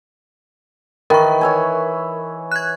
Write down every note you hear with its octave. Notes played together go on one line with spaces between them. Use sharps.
D#3 E3 A#4 B4 C#6
C#5 E5 G#5
F#6 G#6